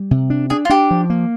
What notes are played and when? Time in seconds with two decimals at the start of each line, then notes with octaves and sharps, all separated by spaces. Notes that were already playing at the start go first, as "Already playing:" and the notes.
Already playing: G3
0.11 C3
0.30 D4
0.50 D4 G#4
0.65 F4
0.70 D4 G4
0.91 F3
1.10 A#3